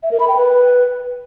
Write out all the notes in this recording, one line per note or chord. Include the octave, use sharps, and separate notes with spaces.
E5
A#4
B5
G5
B4